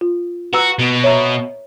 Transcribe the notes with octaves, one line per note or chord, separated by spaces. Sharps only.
F4
F#4 B4 A#5 E6
B2
C#5 E5 A#5